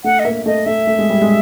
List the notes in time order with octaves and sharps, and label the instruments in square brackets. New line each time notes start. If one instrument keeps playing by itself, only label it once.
[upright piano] A3 [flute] F#5
[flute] D#5
[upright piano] A#3 [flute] E5
[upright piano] A3 [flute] D#5
[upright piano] A3 [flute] E5
[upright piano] A3
G#3
G3
G#3